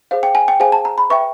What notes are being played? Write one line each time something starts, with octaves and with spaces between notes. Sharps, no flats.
G#4 C5 F5
G5
G#5
G5
G#4 C5 F5 G#5
A5
A#5
B5
B4 E5 G5 C#6